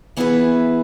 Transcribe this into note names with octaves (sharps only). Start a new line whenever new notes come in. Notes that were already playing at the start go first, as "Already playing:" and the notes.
E3 B3 E4 G#4 B4